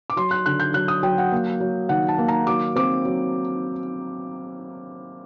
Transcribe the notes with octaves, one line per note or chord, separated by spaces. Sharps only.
D6
F#3 C6
F#6
D3 F#6
G6
F#3 F#6
D#6
F#3 G5
F#5
A#3
F#3
D#3 F#5
A5
A#3
A#5
F#3 D6
C4 D6
F#3